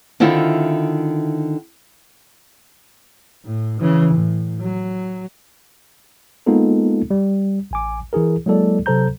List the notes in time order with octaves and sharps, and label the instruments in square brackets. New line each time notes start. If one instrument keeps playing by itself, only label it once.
[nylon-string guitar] D3 D#3 C4 E4 F4
[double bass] A2
C#3 E3
A2
F#3
[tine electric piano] G#3 A#3 B3 D#4 F4 A4
G3
A1 G#5 D6
E3 E4 G#4 A#4
F#3 G#3 A#3 E4 A4 D5
C3 F#3 A4 C5 A#5 G6